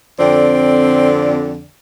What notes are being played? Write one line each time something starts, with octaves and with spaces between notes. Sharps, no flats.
F2 D3 C4 D5